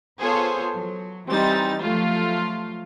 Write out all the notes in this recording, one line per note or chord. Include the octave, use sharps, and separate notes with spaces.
B3 F4 G#4 A4 C5 C#5
F#3
E3 G3 C4 D#4 A6
F3 F#3 A3 F4